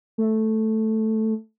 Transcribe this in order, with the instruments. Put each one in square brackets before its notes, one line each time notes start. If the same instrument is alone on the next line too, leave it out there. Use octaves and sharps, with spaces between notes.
[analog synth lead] A3